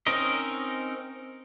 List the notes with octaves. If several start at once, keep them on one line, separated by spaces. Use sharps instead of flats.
C4 C#4 D#4 A#4 D#5